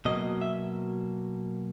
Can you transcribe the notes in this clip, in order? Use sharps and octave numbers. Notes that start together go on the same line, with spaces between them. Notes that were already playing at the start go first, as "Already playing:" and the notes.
B2 F#3 A#3 D#5
E5